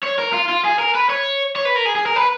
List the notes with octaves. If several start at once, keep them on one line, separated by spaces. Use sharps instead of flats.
C#5
A#4
F4
F4
G#4
A#4
B4
C#5
C#5
B4
A#4
G#4
G#4
A#4
B4